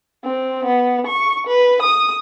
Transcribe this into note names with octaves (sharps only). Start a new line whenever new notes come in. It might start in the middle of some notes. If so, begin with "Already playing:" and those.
C4
B3
C#6
B4
D#6